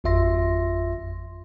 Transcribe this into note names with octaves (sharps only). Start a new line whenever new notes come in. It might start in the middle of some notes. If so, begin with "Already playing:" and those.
G#1 F2 F4 E5 C6 A#6